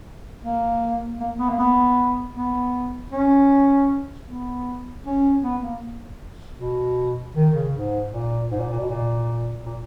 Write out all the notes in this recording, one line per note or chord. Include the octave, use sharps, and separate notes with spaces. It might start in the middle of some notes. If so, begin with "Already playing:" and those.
A#3
A#3
B3
A#3
B3
B3
C#4
B3
C#4
B3
A#3
B2
D#3
C#3
G#2
A#2
G#2
A#2
A#2
B2
A#2
A#2